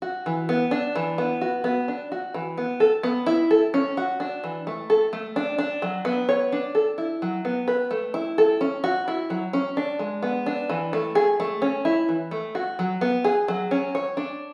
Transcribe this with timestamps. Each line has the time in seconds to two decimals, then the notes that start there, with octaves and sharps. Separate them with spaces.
0.02 F#4
0.26 E3
0.49 B3
0.71 D4
0.95 E3
1.18 B3
1.41 F#4
1.64 B3
1.88 D4
2.12 F#4
2.34 E3
2.57 B3
2.80 A4
3.03 B3
3.26 E4
3.51 A4
3.74 C#4
3.97 F#4
4.20 D4
4.44 E3
4.67 A3
4.90 A4
5.13 A3
5.36 D4
5.58 D4
5.82 F#3
6.05 B3
6.29 C#5
6.52 D4
6.75 A4
6.98 E4
7.22 F#3
7.45 B3
7.68 B4
7.91 A3
8.14 E4
8.38 A4
8.61 C#4
8.84 F#4
9.08 E4
9.30 F#3
9.53 C#4
9.77 D4
9.99 G#3
10.22 B3
10.46 D4
10.69 E3
10.93 A3
11.15 G#4
11.40 A3
11.62 C#4
11.85 E4
12.09 E3
12.31 A3
12.55 F#4
12.79 F#3
13.01 B3
13.24 G#4
13.48 F#3
13.71 C#4
13.95 C#5
14.17 D4